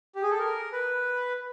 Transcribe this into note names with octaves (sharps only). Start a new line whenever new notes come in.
G4
G#4
A4
A#4
B4